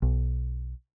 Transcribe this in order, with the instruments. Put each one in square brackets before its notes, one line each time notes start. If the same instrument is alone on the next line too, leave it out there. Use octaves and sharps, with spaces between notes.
[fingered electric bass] B1